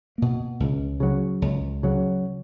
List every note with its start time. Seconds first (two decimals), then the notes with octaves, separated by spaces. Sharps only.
0.18 B2 A#3
0.60 C#2
1.00 C#3 F#3
1.42 C#2
1.83 C#3 F#3